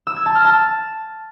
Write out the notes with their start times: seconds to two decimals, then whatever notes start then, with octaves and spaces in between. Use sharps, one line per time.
0.07 E6
0.16 G#6
0.26 A5
0.35 F6
0.45 A5